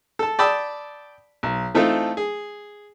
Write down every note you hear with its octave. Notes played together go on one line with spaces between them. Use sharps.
A4 A5
D5 G5 A5 B5 D#6 E6
B1
E3 A3 C4 D#4 F4 A4
G#4